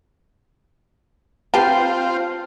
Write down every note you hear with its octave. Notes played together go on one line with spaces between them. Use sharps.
C4 F4 G4 B4 A5 G6 C7